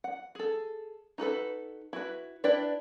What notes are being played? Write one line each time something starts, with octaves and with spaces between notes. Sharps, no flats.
F#5
G#4 A4
D#4 F#4 A4 B4
E4 F#4 B4
D4 E4 B4 D5 G5